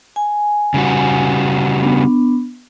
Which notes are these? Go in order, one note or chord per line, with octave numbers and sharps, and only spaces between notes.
G#5
C#3 G3 F#4
B3 D4